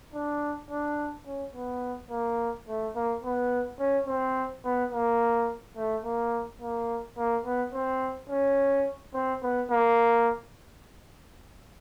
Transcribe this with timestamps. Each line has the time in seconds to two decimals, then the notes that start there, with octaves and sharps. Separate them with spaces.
0.14 D4
0.71 D4
1.27 C#4
1.55 B3
2.10 A#3
2.68 A3
2.96 A#3
3.24 B3
3.79 C#4
4.07 C4
4.65 B3
4.92 A#3
5.76 A3
6.04 A#3
6.61 A#3
7.18 A#3
7.45 B3
7.73 C4
8.29 C#4
9.14 C4
9.43 B3
9.70 A#3